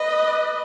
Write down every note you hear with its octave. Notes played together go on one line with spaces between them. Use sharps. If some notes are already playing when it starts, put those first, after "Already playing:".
Already playing: B4 D#5